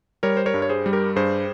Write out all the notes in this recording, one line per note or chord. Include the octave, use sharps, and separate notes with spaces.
G3 A#4 C#5
C5
A#4 C#5
G2
C#5
G#4 C5
G3
G4 A#4
G2 G#4 C5